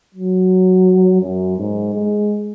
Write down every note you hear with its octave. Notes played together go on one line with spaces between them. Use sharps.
F#3
F#2
G#2
G#3